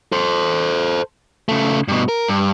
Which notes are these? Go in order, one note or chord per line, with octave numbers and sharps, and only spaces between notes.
A4 C5
C#3 A3
G2 B2
A#4
G2